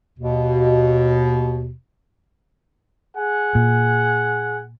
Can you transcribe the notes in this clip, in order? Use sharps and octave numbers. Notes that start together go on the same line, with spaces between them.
D#2 B2
G#4 F#5 G#5
A#2